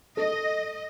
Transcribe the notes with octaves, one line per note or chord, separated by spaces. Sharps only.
A4 D#5